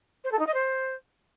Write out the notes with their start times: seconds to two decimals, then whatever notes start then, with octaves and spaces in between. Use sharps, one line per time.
0.24 C5
0.32 A4
0.39 D#4
0.47 D#5
0.54 C5